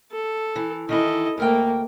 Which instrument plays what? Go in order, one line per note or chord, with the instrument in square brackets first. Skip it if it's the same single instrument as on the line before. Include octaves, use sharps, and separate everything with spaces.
[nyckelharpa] A4
[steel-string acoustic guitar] E3
[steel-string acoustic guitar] D#3 E3 E4 [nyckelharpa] A4 D#5
[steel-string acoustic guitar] D2 A#4 G5 [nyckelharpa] A3 A#3